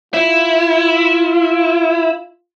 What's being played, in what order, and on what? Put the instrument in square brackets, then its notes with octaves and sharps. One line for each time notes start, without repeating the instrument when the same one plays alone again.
[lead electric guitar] E4 [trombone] F4